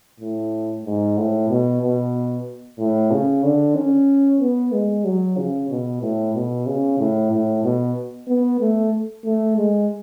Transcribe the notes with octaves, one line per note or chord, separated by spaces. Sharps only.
A2
G#2
A2
B2
B2
A2
C#3
D3
C#4
B3
G#3
F#3
C#3
B2
A2
B2
C#3
A2
A2
B2
B3
A3
A3
G#3